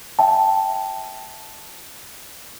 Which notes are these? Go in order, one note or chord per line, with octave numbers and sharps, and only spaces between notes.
E5 G5 A5